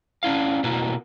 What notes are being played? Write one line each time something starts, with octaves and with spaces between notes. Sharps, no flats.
C#4 D4 E4 F5
B2 A#3 E4 F#4